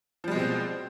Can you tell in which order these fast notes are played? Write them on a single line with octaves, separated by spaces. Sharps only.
F3 G3 G#3 B2 C4